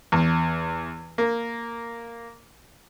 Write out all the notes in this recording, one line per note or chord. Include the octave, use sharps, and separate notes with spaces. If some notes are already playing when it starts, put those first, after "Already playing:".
E2
A#3